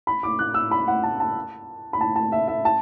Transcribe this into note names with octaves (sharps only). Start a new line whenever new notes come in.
B5
D6
F#6
E6
B5
F#5
A5
A5
B5
A5
A5
E5
E5
A5